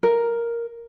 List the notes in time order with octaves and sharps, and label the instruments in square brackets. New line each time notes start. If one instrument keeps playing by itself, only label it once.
[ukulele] A#4